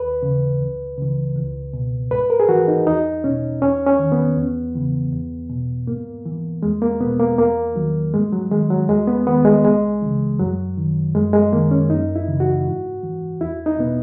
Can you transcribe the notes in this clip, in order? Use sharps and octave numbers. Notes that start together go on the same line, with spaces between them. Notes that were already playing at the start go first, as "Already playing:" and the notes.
Already playing: D#2 B4
C#3 E3
C#2
C#3 E3
C#2
B2
G#2 B4
A#4
G#4
E3 F#4
D#4
E2 D#4
B2 C#4
E2 C#4
C#4
D#3
B3
E2
C#3 E3
E2
B2
G#2 A#3
E3
E2 G#3
A#3
B2 B3
A#3
E2 A#3
D#3 F#3
G#2 G#3
F#3
D#3 G#3
F#3
E2 G#3
B3
D#3 B3
G#3
C#2 G#3
C#3 E3
F#2 F#3
D#3
F#2 G#3
G#3
D#3 A#3
C#4
F#2 D#4
E4
C#3 E3
F#4
G#2
E3
E2 E4
D#4
B2 B3